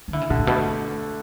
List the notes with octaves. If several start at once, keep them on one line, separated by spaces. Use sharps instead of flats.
E3
D3 E4
C#3
B2 D3
A2
B2 A3